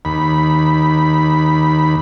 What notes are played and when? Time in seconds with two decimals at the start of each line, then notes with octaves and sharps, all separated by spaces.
0.05 D#2 B5